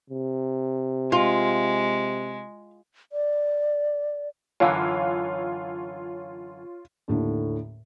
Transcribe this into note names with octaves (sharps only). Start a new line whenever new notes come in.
C3
G#3 F4
D5
F#2 D3 E3 F4 C#5 F5
D#2 A2 D3